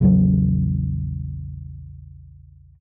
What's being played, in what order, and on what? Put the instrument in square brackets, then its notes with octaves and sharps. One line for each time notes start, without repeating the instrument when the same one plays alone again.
[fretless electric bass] A#1 E2 C#3 F#3